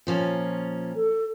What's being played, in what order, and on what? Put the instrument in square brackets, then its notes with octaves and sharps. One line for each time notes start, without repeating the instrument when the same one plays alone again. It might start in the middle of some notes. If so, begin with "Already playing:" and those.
[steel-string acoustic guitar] A#2 F3 C#4
[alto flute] A4